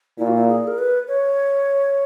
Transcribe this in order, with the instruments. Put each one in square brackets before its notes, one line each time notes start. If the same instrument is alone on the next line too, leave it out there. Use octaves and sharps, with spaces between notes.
[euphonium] A#2 [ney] E4
[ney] F#4
E4
G#4
A#4
B4
C#5